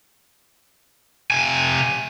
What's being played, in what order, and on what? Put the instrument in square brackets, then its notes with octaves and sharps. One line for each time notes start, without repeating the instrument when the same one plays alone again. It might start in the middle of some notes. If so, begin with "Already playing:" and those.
[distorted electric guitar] C3 G#5